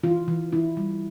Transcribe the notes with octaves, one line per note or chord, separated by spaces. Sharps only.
E3 F4
E3
E3 E4
G3